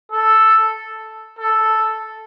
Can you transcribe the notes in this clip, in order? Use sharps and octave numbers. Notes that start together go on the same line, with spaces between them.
A4
A4